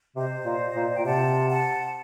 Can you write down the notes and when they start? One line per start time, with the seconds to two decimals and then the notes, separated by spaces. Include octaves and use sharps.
0.16 C3 C5 D#5
0.45 A#2
0.76 A#2
0.94 A#2 G5
1.04 C3 F#5 A5
1.48 F#5 A5